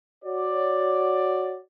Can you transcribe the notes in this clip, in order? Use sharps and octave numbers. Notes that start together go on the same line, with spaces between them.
F#4 C#5 D5